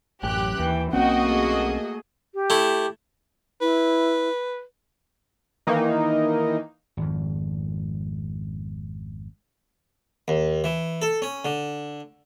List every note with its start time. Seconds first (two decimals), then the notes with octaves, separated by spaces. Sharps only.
0.23 A1 F#2 G4 F#6
0.59 D#2 E3 G5
0.93 B1 A#3 C4 C#4 F#4 D#5 F#5 G5
1.27 A3 G#4
2.34 G4
2.50 A3 E4
3.61 E4 B4
5.67 D#3 E3 A#3 D#4
6.97 G#1 F2
10.28 D#2
10.64 E3
11.02 A4
11.22 C#4
11.45 D3